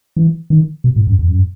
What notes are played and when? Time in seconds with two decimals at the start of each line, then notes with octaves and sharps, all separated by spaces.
0.16 E3
0.50 D#3
0.84 B2
0.96 A2
1.07 F#2
1.19 E2
1.28 F#2